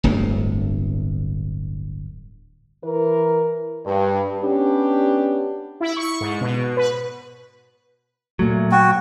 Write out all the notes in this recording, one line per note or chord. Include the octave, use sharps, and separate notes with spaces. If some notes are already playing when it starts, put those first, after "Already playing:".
D1 G1 D2 A2
E3 A#4
G2
B3 C#4 D4 G4
E4
C#6
G#2
B2
B4
A#2 F#3 A3
F#4 G5